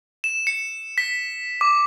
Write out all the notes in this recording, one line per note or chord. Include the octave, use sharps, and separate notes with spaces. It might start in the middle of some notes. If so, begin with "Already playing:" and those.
E7
C#7
B6
D6